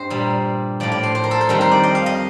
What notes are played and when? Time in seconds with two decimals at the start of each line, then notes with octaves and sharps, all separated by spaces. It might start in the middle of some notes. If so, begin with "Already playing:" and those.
Already playing: G2 G4 C5 D#5
0.10 A#2 G3
0.80 A2 F3 D5
0.92 D5
1.03 C5
1.15 C5
1.24 A#4
1.31 A4
1.41 C5
1.49 F2 D#3 G3 A#4
1.61 C5
1.71 D5
1.83 D#5
1.95 F5
2.06 D#5